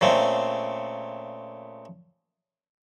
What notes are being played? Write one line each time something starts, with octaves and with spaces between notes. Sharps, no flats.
A#2 C#3 A3 C4